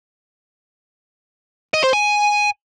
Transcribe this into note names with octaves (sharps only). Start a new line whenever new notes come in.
D#5
C5
G#5